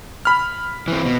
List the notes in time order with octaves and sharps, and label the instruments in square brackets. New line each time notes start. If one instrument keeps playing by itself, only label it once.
[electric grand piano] B5 F6
[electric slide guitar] E3 C4
B2